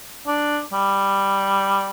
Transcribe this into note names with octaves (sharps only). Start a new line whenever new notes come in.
D4
G3